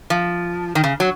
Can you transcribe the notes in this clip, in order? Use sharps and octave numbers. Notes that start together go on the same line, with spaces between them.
F3
D#3
C#3
F#3